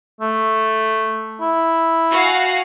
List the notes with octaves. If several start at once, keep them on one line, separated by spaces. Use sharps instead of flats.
A3
E4
F#4 F5 G#5